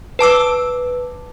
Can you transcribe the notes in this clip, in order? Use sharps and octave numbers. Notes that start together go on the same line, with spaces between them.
B4 A5 D6 E6